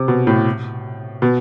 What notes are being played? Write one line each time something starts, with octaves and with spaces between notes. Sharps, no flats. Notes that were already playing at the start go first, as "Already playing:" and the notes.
Already playing: C3
B2
A2
B2